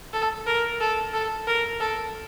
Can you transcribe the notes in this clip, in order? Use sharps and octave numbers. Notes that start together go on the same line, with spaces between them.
A4
A#4
A4
A4
A#4
A4